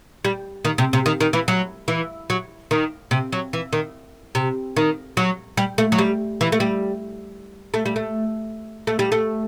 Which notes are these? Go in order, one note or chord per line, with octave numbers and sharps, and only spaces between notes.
G3
D#3
C3
C3
D#3
D#3
E3
F#3
E3
F#3
D#3
C3
F#3
E3
D#3
C3
D#3
F#3
G3
A3
F#3
G3
E3
A3
G3
A3
G3
A3
A3
G3
A3